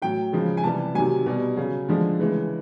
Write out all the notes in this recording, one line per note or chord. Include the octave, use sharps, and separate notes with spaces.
A2 F#3 G5
C#3 F3 G#3
G#5
C3 E3 G3 A5
C3 D#3 F#3 G#5
B2 G3
C#3 F#3
D3 F3 G#3
C#3 E3 G#3